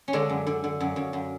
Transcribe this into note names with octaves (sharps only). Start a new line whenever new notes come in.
C#4
D3 G#3 D4
F#2
D3
D3
F#2
F#2
F#2